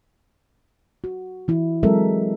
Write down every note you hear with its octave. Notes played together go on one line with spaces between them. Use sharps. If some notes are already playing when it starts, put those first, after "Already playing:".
F#4
E3 E4
F#3 G#3 C4 A4 A#4 E5